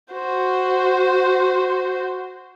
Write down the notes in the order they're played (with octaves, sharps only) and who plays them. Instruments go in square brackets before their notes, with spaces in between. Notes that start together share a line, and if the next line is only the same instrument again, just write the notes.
[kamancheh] F#4 C5